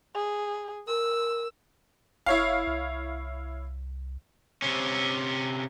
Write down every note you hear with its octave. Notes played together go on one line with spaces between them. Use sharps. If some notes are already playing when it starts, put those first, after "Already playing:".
G#4
A#4 E6
F#1 E4 C#5 F5
C2
C3 C#4